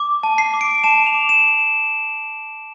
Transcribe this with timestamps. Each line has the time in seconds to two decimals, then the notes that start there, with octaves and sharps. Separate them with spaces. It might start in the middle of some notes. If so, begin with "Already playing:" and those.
Already playing: D6
0.23 A5
0.38 C7
0.54 D6
0.61 D7
0.84 A5 E7
1.06 F7
1.14 D6
1.29 E7